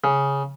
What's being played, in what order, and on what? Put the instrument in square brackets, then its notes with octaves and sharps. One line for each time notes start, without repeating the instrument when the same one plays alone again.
[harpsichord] C#3